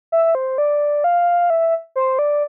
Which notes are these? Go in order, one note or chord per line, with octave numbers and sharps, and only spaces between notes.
E5
C5
D5
F5
E5
C5
D5